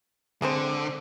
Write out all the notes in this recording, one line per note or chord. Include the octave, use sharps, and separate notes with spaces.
D3 G#3 C4 C5